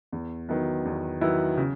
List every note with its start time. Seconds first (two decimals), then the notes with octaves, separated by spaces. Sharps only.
0.12 E2
0.49 D#3 F#3 B3 E4
0.85 E2
1.21 D#3 F#3 B3 E4
1.57 C#3